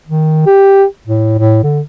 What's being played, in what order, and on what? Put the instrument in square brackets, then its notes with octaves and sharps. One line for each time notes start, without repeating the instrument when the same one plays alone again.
[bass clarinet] D#3
G4
A2
A2
D3